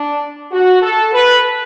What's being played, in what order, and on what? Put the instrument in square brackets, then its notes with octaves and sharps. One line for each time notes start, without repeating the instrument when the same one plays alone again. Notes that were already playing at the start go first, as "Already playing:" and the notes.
Already playing: [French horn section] D4
F#4
A4
B4